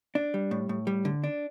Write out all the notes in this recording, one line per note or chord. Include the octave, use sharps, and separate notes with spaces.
D4
G3
A2
A2
G3
D3
D4